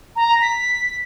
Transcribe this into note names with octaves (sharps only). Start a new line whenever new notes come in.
A#5
B6